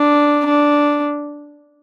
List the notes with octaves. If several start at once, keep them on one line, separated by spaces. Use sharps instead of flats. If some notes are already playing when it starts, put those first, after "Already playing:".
Already playing: D4
D4